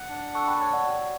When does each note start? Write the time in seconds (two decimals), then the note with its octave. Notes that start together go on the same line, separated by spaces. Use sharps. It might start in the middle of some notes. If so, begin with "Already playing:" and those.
Already playing: F#5
0.09 D4
0.35 A4 A5 C#6
0.48 G5 B5
0.60 C#5 A5 C#6
0.73 D5 F#5
0.87 F#4